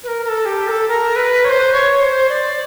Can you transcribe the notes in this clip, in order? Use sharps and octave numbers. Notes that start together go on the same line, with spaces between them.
B4
A#4
A#4
A4
G4
A#4
A4
A#4
B4
C#5
C5
C#5
C5
D5